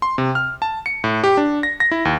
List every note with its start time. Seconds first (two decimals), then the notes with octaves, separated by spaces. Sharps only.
0.02 C6
0.18 C3
0.35 F6
0.62 A5
0.86 C#7
1.04 A2
1.24 G4
1.37 D4
1.63 A#6
1.80 A#6
1.91 E4
2.05 D#2